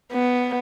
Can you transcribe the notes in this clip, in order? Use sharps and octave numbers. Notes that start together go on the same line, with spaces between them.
B3